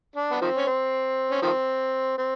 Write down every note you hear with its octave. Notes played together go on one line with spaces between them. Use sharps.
D4
B3
D#3 F3 C4
C#4
C4
C#4
D#3 F3 C4
C4